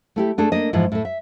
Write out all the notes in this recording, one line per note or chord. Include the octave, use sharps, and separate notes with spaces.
A3 E4 G4
A3 D4 G#4 A4
A#3 D4 D#5
G#2 E3 F3
A2 A3
E5